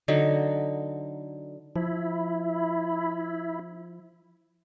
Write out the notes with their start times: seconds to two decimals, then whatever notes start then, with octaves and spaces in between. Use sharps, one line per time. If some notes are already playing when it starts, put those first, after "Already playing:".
0.08 D3 F#3 D#4
1.76 F3 E4